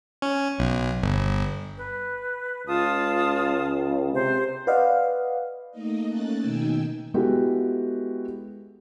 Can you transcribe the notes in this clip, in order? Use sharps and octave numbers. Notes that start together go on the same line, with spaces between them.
C#4
B1
G1
B4
C#2 F4 A5 D#6
C3 C5
B4 D5 D#5 F5 F#5
A3 A#3 D#4 D#5
A3 A#3 C#4 F#6 A6
B2 D#3 D#4 G5 G#5 E6
G#3 B3 E4 F#4 G4 A4